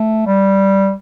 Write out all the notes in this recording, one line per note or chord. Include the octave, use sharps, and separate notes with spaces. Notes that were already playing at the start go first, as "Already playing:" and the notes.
Already playing: A3
G3